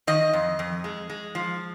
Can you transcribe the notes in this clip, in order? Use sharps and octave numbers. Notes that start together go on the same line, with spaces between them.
D#3 D#5
F2
F2
G#3
G#3
F3